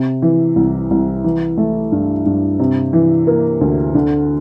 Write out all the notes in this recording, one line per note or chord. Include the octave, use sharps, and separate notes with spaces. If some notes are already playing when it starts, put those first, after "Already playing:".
Already playing: C3
E3
C2
C2
E3
A3
G2
G2
C3
E3
A#3
D2
D3